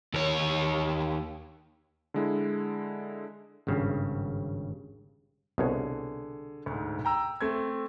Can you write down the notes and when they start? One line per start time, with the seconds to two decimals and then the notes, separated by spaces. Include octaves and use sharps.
0.14 D#2 C#5
2.14 D3 G#3 E4
3.67 G#1 G2 C#3
5.58 C2 B2 D3 G#4 C#5
6.66 D2 G#2
7.05 G5 A#5 E6
7.41 A3 C4 G#6